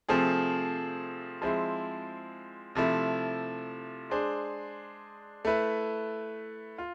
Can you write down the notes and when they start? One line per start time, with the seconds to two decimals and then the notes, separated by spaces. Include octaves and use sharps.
0.09 C3 F3 A3 C4 G#4
1.42 F3 G#3 C4 E4
2.75 C3 F3 A3 E4
4.10 G#3 D4 G#4 C5
5.45 A3 E4 B4
6.78 F4